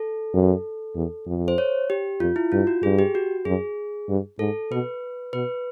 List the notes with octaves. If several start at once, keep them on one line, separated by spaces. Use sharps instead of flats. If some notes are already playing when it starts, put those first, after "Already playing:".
Already playing: A4
F#2
E2
F2
C5
C#5
G4
F2 F4
E4
G2 F4
F#4
G2 G#4
G4
F#4
F#2 G#4
G2
G#2 A4
B2 B4
B2 B4